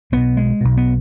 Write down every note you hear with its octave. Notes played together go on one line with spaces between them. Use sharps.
B1 B2 B3
G#3
B1 B2
B3